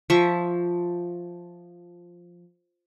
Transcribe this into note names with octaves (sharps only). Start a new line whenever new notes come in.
F3 E5 C#6